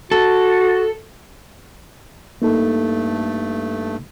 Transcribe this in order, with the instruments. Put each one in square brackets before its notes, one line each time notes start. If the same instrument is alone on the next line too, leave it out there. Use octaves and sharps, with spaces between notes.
[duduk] F#4 [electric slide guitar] A4
[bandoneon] G2 A3 [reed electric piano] A#3 D#4 A4